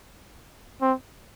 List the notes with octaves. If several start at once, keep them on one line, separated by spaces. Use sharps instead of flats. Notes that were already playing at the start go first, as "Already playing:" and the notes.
C4